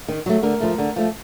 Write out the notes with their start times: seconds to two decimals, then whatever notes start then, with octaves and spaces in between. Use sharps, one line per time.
0.08 D#3
0.26 F#3 A3
0.43 D3 A#4
0.60 F3 A3
0.78 D3
0.96 F3 A3